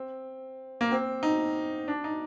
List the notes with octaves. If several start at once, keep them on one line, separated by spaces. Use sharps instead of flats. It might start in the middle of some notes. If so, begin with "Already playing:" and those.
Already playing: C4
A#3
C4
D#4
D4
D#4